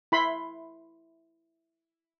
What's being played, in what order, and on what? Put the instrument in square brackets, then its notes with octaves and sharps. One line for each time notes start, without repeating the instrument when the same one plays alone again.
[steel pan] E4 B5 C6